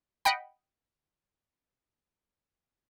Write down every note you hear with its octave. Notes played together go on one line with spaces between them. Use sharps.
D#5 F#5 G5 B5